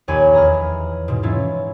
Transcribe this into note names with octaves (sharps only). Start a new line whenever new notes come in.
A#1 D#2 C#5 G#5 B5
E2 A#5 B5 F6
G#2 B2
E3 F#3 C#4 E4 F4